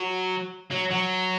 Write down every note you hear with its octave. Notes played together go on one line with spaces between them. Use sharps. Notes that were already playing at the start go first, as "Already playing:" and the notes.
Already playing: F#3
F#3
F#3